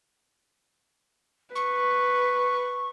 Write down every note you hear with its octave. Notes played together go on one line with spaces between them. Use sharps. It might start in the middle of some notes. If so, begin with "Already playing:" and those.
B4 C#6